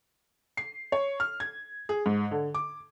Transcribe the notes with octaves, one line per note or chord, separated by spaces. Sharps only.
C7
C#5
F6
G#6
G#4
G#2
D3
D6